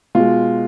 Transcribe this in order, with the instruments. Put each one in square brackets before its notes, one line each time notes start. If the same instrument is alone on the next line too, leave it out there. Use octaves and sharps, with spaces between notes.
[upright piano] B2 G#3 F4